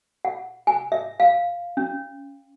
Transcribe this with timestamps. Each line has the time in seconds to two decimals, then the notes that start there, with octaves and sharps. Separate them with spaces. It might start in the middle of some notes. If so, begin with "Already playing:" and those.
0.25 F#5
0.67 G#5
0.92 E5
1.20 F5
1.77 C#4